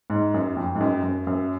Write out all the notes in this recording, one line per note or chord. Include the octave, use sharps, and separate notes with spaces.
G#2
F#2
F2
G#2
F#2
F#2
F#2